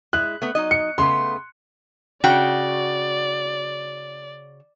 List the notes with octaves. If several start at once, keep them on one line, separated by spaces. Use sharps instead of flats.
G#3 E4 F#6
A3 B3
F#3 D#4 D#5
C#7
C#3 A3 B3 C6
C#3 F#4 D5 G5